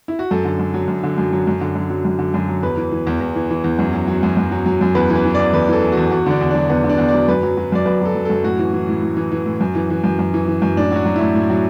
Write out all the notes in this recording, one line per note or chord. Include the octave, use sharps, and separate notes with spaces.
E4
F#4
F#2 A4
D3
F#2
F#3
F#2
D3
F#2
F#3
F#2
D3
F#2
F#3
F#2
D3
F#2
F#3
E2 B4
E3
E3
E2
E2
E3
E3
E2
F#2
F#3
F#3
F#2
F#2
F#3
F#3
F#2
E2 B4
E3
B4
E3
E2 D5
E2 B4
E3 A4
E3
E2 F#4
E2 F#4
D3 D4
E2
F#3 D4
E2 B3
D3
D4
E2
D5
F#3
F#2 B4
F#3
F#3
F#2 D5
F#2 B4
F#3 A4
F#3
F#2 A4
A2 F#4
E3
E3
A2
A2
E3
E3
A2
F#2
E3
E3
F#2
F#2
E3
E3
F#2
A2 D4
F#3 F#4
F#3
A2 E4
A2
F#3